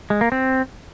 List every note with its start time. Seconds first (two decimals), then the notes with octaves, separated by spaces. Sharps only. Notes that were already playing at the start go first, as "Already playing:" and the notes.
0.10 G#3
0.21 A#3
0.32 C4